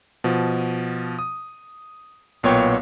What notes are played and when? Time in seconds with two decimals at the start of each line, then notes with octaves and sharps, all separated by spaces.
0.24 B2 F3
1.19 D#6
2.43 B1 A#2 B3 C#5 G5